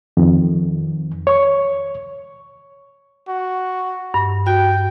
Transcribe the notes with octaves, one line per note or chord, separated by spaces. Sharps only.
F2 D#3
C#5 C#6
F#4
G2
F#4 G5